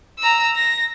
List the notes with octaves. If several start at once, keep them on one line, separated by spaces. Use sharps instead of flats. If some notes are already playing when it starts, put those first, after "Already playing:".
A#5 E6
A#6